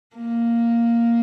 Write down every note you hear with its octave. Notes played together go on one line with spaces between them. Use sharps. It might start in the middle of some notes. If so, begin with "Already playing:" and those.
A#3